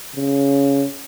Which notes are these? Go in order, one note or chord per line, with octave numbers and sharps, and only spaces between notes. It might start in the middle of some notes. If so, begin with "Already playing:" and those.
C#3